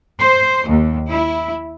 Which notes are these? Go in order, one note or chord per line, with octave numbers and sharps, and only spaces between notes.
C5
D#2
E4